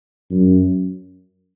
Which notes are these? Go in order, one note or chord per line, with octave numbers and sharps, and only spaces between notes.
F#2